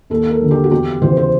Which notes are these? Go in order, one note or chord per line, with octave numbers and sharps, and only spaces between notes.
D#2 A4
A#4
D3 F3
G4
F#4
E2 G4
C#3 E3 C5
C5